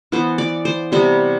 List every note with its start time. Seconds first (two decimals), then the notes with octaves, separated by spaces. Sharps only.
0.12 E3 B3 C5
0.38 D5
0.65 C5
0.92 C3 G3 B3 C5